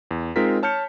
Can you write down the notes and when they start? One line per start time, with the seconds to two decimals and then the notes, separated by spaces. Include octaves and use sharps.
0.11 E2
0.36 G#3 C4 D#4 F4 A#4 B6
0.63 C#5 A5 F6 G6 C#7